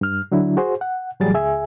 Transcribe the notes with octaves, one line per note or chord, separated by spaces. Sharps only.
G2 F6
D3 F#3 D4 E4
F#4 G#4 C5
F#5
A2 E3 F#3 G3 G#4 A6
C#2 G#4 E5 G#5